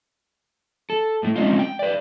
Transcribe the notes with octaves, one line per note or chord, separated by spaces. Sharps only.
A4
A2 A3
G#3 C4 C#4 D#4 F4
G5
B4 D5